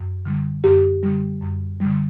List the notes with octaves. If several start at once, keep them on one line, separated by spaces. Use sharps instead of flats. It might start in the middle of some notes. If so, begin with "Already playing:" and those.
Already playing: F#2
D3 G3
F#2 G4
D3 G3
F#2
D3 G3